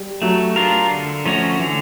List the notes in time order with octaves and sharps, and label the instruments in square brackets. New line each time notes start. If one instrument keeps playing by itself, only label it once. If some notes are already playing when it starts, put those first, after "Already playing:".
Already playing: [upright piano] G3
[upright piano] F#3 [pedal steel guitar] A3
[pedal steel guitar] D4 F4 A#4
D3
F3 A3 C#4 F#4
[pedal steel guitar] D3 [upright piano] E3